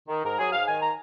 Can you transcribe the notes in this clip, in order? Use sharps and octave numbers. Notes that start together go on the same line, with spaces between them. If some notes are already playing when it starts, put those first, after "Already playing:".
D#3
G#2 A#4
F#3 G#4
G#2 F5
D#3 G#5
A#5